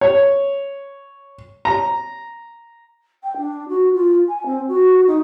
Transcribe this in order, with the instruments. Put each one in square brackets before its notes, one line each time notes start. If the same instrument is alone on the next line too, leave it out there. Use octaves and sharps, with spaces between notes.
[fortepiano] C#5
A#5
[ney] G5
D4
F#4
F4
G#5
C4
F#4
D#4